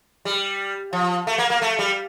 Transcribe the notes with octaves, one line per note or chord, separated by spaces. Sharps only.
G3
F3
A3
A#3
A#3
A3
G3